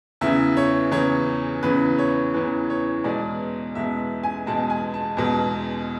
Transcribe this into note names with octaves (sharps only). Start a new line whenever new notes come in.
E2 C#3 E3 E5
C#5
E2 C#3 E3 C#5
E2 C#3 E3 B4
C#5
E2 C#3 E3 B4
C#5
E2 B2 G#3 D5
E2 B2 G#3 E5
G#5
E2 B2 G#3 A5
G#5
A5
E2 B2 G#3